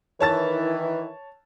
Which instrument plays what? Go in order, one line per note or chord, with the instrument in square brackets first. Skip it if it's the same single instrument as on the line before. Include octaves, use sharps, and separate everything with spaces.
[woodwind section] D#3 E3 [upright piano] C#5 A5 A6